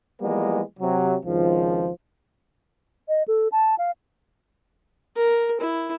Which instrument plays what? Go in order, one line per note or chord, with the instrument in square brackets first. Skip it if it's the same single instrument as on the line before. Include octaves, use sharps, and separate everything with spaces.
[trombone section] E3 F3 G3 G#3 A#3 B3
C3 F#3
G#1 C#2 D#3 F3
[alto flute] D#5
A4
A5
F5
[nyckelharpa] A#4
E4